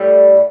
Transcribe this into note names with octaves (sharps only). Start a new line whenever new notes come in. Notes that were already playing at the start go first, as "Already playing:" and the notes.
Already playing: A2 G3